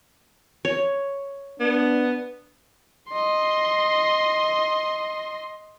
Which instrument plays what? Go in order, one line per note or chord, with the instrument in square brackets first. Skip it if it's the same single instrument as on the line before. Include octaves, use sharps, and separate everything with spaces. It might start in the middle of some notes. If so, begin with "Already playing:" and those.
[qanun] C#5
[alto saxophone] B3 [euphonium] D4
[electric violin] D#5 C6